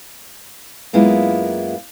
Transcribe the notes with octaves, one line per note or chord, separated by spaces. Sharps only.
F#2 G#3 A#3 B3 E4 F4